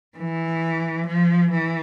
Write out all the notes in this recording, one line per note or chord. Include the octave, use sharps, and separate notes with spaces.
E3
F3
E3